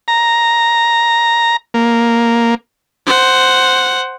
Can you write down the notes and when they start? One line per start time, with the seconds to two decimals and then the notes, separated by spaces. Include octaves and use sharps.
0.08 A#5
1.74 A#3
3.06 C5 F#5